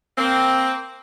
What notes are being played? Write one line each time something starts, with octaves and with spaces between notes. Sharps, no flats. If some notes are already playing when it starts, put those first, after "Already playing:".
A#3 C4